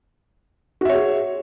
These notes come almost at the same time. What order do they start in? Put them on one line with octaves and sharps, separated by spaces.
F#4 E5 C#5 G#4